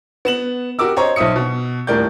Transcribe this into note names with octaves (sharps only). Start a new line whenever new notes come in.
B3 E7 F#7
F#4 G4 A#4 D6 E6
C5 C#5 D#5 A#5
B1 C5 E5 D#6 C#7
B2
D#1 A2 A#4 D5 G6